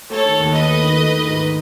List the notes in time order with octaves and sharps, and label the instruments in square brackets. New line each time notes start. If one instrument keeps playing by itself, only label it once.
[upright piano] A3 [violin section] A4 C#5
[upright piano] D#3
D#2
[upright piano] D#2 [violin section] B4 D#5
[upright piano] A3
D#3
A3
D#3
G#2